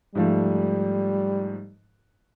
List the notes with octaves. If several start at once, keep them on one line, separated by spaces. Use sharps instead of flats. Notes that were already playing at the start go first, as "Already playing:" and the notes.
G#2 F3 G3 A3